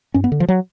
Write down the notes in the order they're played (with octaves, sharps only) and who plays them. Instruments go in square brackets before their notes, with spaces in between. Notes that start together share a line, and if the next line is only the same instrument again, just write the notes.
[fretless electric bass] G2 C#4
B3
D3
F3
F#3